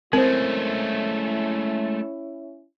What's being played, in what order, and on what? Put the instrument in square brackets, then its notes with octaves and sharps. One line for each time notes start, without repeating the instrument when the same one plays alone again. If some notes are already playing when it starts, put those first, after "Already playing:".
[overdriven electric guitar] G#3 A3 [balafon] C4 [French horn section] C#4 E4 [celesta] A#4 C5